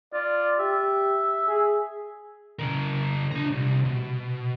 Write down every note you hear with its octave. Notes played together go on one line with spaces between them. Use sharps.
F4 D5
G4 E5
G#4
C#3 A#4
D4 A#5
C2
B2